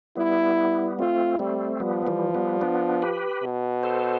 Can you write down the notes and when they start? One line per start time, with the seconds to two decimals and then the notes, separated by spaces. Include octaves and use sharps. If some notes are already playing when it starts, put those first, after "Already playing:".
0.16 G3 B3 E4
0.99 A3 C4 F4
1.39 G3 A3 C4
1.80 F3 G3 B3
2.07 E3 G3
2.34 G3 B3
2.61 B3 D4
3.02 G4 B4
3.43 B2
3.83 A4 C5